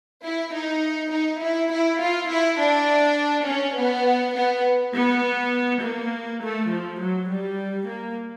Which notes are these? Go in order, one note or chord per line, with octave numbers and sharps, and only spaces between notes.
E4
D#4
D#4
E4
E4
F4
E4
D4
C#4
B3
B3
B3
A#3
A3
F3
F#3
G3
A#3